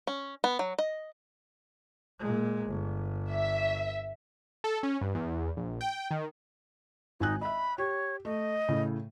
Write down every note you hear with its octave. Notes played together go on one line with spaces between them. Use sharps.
C#4
B3
F#3
D#5
A#2 G#3
G1
E5
A4
C#4
G2
E2
A#1
G5
D#3
G#1 D#4 G#5 F#6
D#5 E5 B5
G4 C#5
A3 D#5
A2 C#3